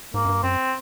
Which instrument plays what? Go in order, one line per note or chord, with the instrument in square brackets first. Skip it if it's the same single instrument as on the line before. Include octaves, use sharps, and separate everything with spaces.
[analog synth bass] G#2 [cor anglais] A#3
[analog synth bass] F#2
G2
[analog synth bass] F#2 [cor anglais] C4